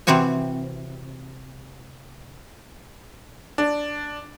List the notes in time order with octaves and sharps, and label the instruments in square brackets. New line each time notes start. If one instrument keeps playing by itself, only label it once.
[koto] C3 E3 C4 F#4 G#5
[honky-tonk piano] D4